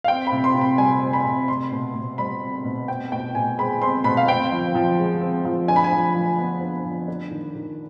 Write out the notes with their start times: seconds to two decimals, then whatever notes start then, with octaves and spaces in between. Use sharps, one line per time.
0.04 F5
0.08 C4 G5
0.27 B5
0.32 C3
0.44 C6
0.55 C3
0.61 B5
0.78 G3 G#5
1.02 C4
1.13 B5
1.25 C3
1.48 C4 C6
1.72 B2
1.95 B2
2.18 G3 B5
2.42 C4
2.64 B2
2.88 C4 G5
3.12 B2 G5
3.35 B2 G#5
3.58 G#3 B5
3.81 C4 C6
4.04 B2 B5
4.17 F5
4.28 C4 G5
4.52 F3
4.75 F3
4.98 G#3
5.21 C4
5.45 F3
5.68 D4 G#5
5.76 B5
5.84 G#5
5.92 F3
6.15 F3
6.39 B3
6.61 D4
6.85 F3
7.08 D4
7.31 D#3
7.55 D#3